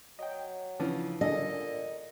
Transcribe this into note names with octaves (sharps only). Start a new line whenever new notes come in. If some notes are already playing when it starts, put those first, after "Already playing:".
F#3 D#5 G5
C#3 E3 F3 D4
A#2 D3 D4 G#4 A4 D#5